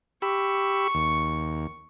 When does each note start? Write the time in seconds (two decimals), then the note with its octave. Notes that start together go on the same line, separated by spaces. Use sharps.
0.22 G4 B5 C#6 E6
0.95 D#2